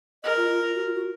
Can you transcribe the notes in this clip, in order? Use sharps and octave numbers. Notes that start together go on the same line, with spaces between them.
A#4 D#5
F4
F4
F#4
F4
F#4